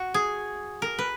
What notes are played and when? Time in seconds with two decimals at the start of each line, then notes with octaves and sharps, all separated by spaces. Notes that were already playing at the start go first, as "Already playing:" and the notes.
Already playing: F#4
0.14 G#4
0.82 A#4
0.99 B4